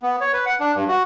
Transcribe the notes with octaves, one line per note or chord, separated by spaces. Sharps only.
B3
C#5
B4
F#5
D4
G2
F#4